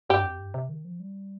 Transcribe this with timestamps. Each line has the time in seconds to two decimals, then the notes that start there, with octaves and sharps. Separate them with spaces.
0.10 G2 G4
0.24 F2
0.39 G2
0.54 C3
0.69 D#3
0.85 F3
1.00 G3